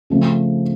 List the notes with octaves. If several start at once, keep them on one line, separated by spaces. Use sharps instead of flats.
C#3 F3 A3 C4